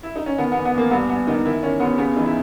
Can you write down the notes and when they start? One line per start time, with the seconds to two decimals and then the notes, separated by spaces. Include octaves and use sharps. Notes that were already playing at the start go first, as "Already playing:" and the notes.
0.03 E4
0.16 D#4
0.26 C#4
0.38 D#3 B3
0.52 B3
0.57 E2
0.65 B3
0.74 E2 A#3
0.91 G2 B3
1.09 G2 B3
1.27 D#3 D#4
1.44 D#3 E4
1.63 D#3 C#4
1.80 D#2 B3
1.98 C#3 B3
2.16 E3 D#4
2.26 E4